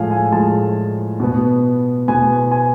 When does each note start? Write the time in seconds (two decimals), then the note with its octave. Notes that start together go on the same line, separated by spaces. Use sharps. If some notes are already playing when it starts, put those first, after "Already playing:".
Already playing: A2 F3 G#3 F5 G#5
0.11 G#5
0.32 A2 F3 G#3 A5
1.20 B2 B3
2.08 B2 B3 G#5
2.51 G#5